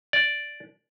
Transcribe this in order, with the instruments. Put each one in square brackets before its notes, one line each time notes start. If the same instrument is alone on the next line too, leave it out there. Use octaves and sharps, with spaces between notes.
[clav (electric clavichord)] D5